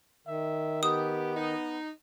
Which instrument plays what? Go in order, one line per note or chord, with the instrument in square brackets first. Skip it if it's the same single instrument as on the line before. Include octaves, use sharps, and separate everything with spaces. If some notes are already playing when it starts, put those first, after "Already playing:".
[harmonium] D#3 [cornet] E5
[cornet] B3 [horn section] G4 [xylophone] D#6
[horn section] D#4